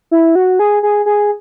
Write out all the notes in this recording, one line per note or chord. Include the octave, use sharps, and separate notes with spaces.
E4
F#4
G#4
G#4
G#4